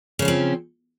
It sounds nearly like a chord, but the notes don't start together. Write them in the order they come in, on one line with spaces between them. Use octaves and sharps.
C#3 C#4 F3 C4